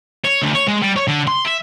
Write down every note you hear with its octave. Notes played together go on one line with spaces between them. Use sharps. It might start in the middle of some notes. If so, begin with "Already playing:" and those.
C#5
D2
C#5
G#3
G3
C#5
D3
C6
E5